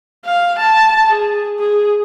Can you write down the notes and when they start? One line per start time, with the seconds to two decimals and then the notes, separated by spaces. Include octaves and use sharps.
0.24 F5
0.58 A5
1.10 G#4
1.60 G#4